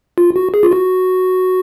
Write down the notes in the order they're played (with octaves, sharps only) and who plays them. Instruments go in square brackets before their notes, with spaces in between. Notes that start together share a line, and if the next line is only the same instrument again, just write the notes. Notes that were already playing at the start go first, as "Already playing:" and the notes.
[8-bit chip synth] F4
F#4
G#4
F4
F#4